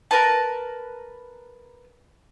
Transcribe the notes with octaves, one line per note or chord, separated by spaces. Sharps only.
A#4 B4 A5